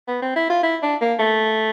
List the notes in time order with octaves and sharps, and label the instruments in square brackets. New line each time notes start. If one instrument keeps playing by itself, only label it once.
[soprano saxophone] B3
C4
E4
F4
E4
D4
A#3
A3